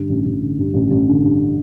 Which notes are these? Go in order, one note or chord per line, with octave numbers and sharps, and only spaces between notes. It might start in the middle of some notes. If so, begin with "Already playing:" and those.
Already playing: G2 D3
A1
A1
D3
G2
A1
A1
D3
G2